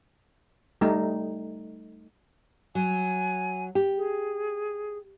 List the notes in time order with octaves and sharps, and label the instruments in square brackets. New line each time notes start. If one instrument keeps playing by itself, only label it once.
[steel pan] G3 A3 D#4
[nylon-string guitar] F#3 [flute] G#5
[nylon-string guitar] G4
[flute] G#4